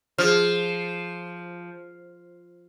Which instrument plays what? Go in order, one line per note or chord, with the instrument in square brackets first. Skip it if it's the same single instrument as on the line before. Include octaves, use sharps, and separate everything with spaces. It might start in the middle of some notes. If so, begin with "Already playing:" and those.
[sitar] F3 [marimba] G#4 F6